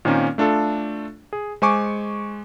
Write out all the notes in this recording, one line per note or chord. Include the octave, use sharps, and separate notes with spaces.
A#2 D#3 A#3 C4 C#4
A3 D4 F4 A4
G#4
G#3 C5 G#5 C#6 D6